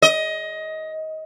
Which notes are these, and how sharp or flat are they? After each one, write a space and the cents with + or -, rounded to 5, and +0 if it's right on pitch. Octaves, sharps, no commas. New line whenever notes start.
D#5 +20